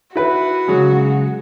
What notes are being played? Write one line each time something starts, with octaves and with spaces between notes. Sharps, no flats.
E4 F#4 B4
C#3 F#3 G#3